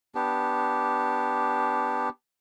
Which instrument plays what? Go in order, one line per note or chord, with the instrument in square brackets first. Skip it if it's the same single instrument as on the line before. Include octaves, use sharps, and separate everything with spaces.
[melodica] B3 D4 G4